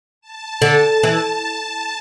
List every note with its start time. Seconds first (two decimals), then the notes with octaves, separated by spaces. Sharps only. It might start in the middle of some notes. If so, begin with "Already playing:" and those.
0.21 A5
0.62 D3
1.03 E3